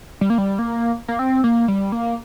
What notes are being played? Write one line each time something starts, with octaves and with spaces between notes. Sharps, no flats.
G3
A#3
G3
A#3
A#3
C4
A#3
G3
A#3